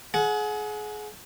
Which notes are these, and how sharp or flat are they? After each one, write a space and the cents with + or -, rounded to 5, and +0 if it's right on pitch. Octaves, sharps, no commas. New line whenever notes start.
G#4 +30 F#5 -15